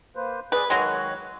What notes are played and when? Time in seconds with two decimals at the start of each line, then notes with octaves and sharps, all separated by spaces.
0.16 A#3 B4 C5
0.52 G#4 B4 D5
0.70 D#3 F#3 G#3 C#5 F#6